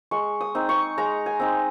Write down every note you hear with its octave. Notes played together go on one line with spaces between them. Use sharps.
G#3 C#6
D#6
C4 D#4
C#6
G#3 A#5
G#5
C4 D#4